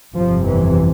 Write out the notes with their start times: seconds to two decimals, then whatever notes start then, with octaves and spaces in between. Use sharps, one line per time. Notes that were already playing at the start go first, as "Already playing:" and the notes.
0.16 G1 F2 C3 F3
0.45 E3